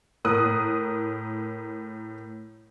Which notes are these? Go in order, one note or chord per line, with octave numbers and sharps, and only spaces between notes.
A2 A#4 D#6 F#6